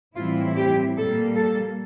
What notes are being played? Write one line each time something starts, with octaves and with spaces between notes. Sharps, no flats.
A2 E3 G3 C4 E4 F4
G4
A#2 G3 A#3 A4
A4